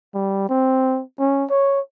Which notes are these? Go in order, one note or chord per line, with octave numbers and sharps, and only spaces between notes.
G3
C4
C#4
C#5